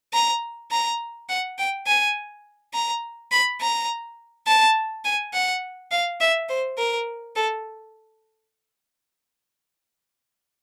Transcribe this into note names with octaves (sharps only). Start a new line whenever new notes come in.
A#5
A#5
F#5
G5
G#5
A#5
B5
A#5
A5
G#5
F#5
F5
E5
C5
A#4
A4